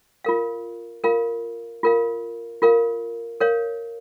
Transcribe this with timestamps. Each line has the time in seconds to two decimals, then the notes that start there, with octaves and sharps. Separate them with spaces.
0.25 F4 A#4 F5
1.04 F4 A#4 F5
1.83 F4 A#4 F5
2.62 F4 A#4 F5
3.40 A#4 C#5 F5